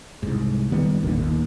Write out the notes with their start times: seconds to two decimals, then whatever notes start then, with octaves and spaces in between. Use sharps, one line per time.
0.23 C2 G#2
0.72 D#3 G3 B3
1.03 G#1 D#2 A#2 D3
1.21 D#2